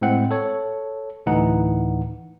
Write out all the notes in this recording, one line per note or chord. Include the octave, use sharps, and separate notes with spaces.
A2 G#3 C4 F#5
A4 C#5
D2 A2 E3 D#4 F#5